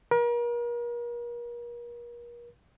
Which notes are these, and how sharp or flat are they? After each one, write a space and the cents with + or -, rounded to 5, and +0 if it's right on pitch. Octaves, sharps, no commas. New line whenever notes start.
A#4 +40